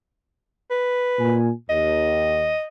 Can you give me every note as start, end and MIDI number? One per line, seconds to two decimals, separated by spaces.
0.71 1.35 71
1.19 1.50 46
1.19 1.50 80
1.70 2.51 39
1.70 2.67 75